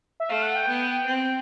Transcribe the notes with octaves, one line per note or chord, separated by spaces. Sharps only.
E5
A3 F5
F#5
G5
B3
C4